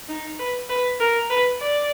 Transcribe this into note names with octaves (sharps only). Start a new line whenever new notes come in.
D#4
B4
B4
A#4
B4
D5